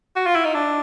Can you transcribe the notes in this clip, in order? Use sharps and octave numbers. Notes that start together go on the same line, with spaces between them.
F#4
F4
E4
D#4
D4